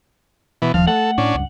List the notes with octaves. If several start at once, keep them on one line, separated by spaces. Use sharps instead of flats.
B2 E3
E1 D#2 F3 F5
A3 A4 F#5
A2 C#4 D4
C#2 G2